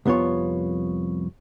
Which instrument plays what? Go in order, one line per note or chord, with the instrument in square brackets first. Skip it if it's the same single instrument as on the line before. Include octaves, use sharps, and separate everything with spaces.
[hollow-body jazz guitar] C2 F2 B3 F4 C#5